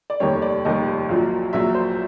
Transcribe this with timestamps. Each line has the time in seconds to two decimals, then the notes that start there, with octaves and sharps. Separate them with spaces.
0.10 D5
0.20 F1 D#2 D#3 G3 C#5
0.42 D5
0.64 F1 D#2 D#3 G3 D#5
1.09 A#1 A#2 F#3
1.53 A#1 A#2 F#3 E5
1.75 C5